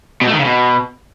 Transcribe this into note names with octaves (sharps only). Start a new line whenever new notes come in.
B2
A3
D#3
C#3
B2